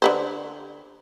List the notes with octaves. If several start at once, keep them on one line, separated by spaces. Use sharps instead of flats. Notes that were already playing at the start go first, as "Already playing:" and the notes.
D3 B4 C5